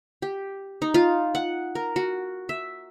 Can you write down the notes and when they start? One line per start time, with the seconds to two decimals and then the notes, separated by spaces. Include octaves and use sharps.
0.22 G4
0.82 D#4
0.94 F4
1.35 F#5
1.75 A#4
1.96 F#4
2.49 E5